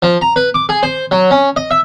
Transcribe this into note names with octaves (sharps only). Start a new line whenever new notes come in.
F3
A#5
B4
D6
G#4
C5
F#3
C#4
D#5
E5